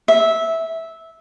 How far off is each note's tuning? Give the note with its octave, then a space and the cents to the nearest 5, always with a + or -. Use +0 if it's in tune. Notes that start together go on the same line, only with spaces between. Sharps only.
E5 -15